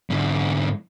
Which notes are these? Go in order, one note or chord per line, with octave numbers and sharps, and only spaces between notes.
G#2 D3